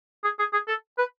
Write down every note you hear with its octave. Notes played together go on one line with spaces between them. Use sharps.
G#4
G#4
G#4
A4
B4